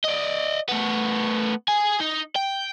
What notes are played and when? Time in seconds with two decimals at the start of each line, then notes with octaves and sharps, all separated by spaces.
0.05 D5 D#5
0.69 A3 B3
1.68 G#4 G#5
2.00 D#4
2.36 G5